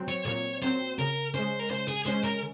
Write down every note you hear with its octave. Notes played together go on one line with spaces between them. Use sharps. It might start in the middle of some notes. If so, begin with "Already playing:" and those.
Already playing: F#3 C4
C#5
A#2 C#5
F#3 C4 C5
C#3 A#4
G#3 C#4 C5
A#4
C#3 C5
G#4
G#3 C#4 C5
A#4